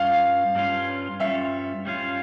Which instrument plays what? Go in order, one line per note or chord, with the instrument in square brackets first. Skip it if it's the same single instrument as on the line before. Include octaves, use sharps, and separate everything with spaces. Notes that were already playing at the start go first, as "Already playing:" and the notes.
Already playing: [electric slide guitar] G2 G3 C#4 F4 [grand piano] F5
[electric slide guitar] G2 G3 C#4 F4
[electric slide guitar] G2 G3 C#4 F4 [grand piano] E5
[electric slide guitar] G2 G3 C#4 F4